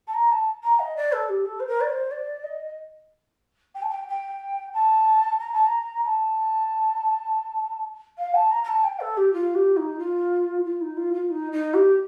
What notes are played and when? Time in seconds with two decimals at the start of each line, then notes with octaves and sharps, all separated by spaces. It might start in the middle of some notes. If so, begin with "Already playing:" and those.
0.07 A5
0.14 A#5
0.31 A5
0.63 A#5
0.79 D#5
0.96 D5
1.12 A4
1.29 G4
1.45 A4
1.60 C5
1.67 A#4
1.80 D5
1.89 C5
2.11 D5
2.44 D#5
3.75 G5
3.82 A5
3.89 G5
4.08 G5
4.73 A5
5.39 A#5
5.53 A5
5.66 A#5
6.05 A5
8.18 F5
8.34 A5
8.51 A#5
8.64 A#5
8.68 A5
8.84 G5
9.00 A4
9.17 G4
9.33 F4
9.55 G4
9.77 D#4
9.99 F4
10.65 F4
10.81 D#4
10.97 F4
11.14 F4
11.30 D#4
11.52 D#4
11.74 G4